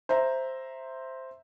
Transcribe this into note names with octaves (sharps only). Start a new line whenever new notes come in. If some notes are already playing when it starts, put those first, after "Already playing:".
C5 E5 A#5